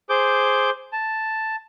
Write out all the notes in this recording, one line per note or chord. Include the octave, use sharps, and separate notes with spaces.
G#4 C5 D6 G6
A5